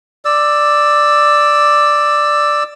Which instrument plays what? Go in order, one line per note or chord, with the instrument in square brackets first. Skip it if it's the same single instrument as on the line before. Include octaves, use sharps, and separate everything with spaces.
[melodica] D5 E6